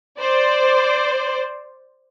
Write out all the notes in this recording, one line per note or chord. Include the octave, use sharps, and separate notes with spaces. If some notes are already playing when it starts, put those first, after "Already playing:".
C5 D5